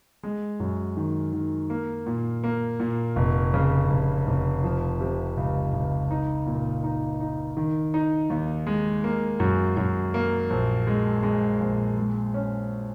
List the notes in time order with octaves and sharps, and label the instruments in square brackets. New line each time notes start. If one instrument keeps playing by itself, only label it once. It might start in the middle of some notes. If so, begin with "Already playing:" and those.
[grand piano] G#3
F#2
D#3
D#3
A#3
A#2
A#3
A#2
F1
C#3
F1
F1
F3
C3
C#2
C#2
D#4
A#2
D#4
D#4
D#3
D#4
D#2
G#3
A#3
F#2
F#2
A#3
A#1
G#3
G#3
A#1
G#3
C#4